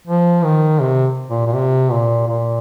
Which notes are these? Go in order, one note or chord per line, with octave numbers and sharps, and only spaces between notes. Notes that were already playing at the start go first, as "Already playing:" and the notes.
F3
D#3
C3
A#2
A#2
C3
A#2
A#2